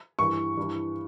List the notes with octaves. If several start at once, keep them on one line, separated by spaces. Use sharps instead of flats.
G2 E3 C#6
G2 E3